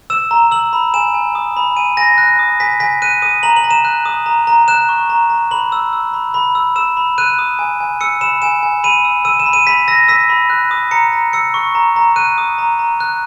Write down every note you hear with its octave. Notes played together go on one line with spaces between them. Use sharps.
E6 E7
A#5
E6 F#7
B5
G#5 E7
G#5
D#6
B5
G#5 D#7
G#5 A#6
F#6 A#6
D#6
G#5 B6
G#5 B6
F#6 D#7
D#6 D#7
A#5 F#7
F#7
A#5
E7
F#6
D#6
A#5
A#5
F#6 E7
C#6
A#5
A#5
B5 F#7
E6
E6
B5
B5
E6
E6 E7
B5
F#6 D#7
D#6
G#5
G#5
E6 C#7
B5 E7
G#5 E7
G#5
B5 D#7
E6
E6 D#7
E7
B5
D#7
B5 B6
E6 A#6
E6 B6
B5
F#6
D#6
A#5 C#7
A#5
E6 C#7
C#6
A#5
A#5
F#6 D#7
D#6
A#5
A#5
F#6